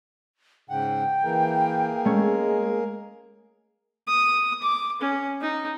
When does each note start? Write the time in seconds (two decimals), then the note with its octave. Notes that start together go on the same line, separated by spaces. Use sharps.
0.69 G#2 C#3 F#5 G5
1.24 E3 A#3 G#4 A#4
2.05 G#3 A3 C#4
4.08 D#6
4.62 D6
5.01 C#4
5.41 D#4